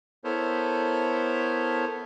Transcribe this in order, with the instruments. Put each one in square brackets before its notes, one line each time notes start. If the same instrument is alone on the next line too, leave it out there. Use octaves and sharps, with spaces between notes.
[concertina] B3 E4 A4 A#4 C5 C#5